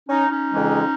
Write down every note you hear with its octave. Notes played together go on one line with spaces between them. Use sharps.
C#4 D#4
C#4 D#4
F2 C#3 E3 G#3